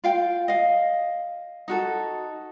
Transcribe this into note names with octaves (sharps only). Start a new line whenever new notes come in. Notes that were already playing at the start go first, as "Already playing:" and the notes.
F4 F5 G5
D#5 F5
D#4 F#4 A4